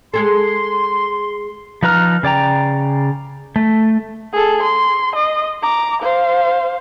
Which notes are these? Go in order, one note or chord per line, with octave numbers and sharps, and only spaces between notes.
G#3 G#4 A4 C6
F3 D#4 B4 A#5 F6
C#3 D5 G5 A#5
A3
G#4 A4
C6
D#5
A#5 D6
C5 F5